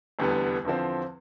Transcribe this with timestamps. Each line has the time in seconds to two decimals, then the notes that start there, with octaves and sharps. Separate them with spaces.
0.19 F1 E2 D3 G3 B3
0.65 E2 D3 F3 C4